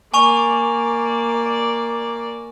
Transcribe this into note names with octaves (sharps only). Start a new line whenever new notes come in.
A#3 D5 G#5 C#6 F7